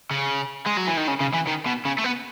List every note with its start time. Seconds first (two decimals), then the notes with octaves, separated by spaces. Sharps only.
0.11 C#3
0.66 G#3
0.77 F#3
0.87 E3
0.97 D#3
1.08 C#3
1.20 C#3
1.34 E3
1.47 D#3
1.66 B2
1.85 C#3
1.98 A3
2.04 B3